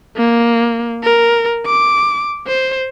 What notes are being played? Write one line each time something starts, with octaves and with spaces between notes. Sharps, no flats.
A#3
A#4
D6
C5